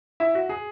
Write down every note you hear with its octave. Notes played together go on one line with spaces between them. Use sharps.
E4 E5
F#4
G#4